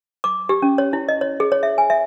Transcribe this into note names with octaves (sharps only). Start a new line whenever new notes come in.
D6
G4
C#4
C#5
E4
D#5
C#5
G#4
C#5
E5
G#5
E5